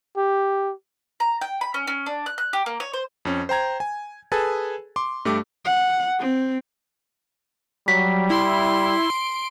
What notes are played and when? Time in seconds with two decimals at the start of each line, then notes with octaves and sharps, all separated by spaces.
0.17 G4
1.20 A#5
1.41 G5
1.61 B5
1.74 C#4
1.87 C#4
2.06 D4
2.26 F#6
2.38 F#6
2.53 G4
2.66 A#3
2.80 C#5
2.93 C5
3.25 F2 C#4
3.49 C5 G5 A#5 G#6
3.80 G#5
4.32 G#4 A4 B4 G#5 A5
4.96 C6 D6
5.25 G2 A3 G4 D6
5.65 F#5
6.20 C4
7.88 F#3 G3 B6
8.30 E4 C6
9.10 D7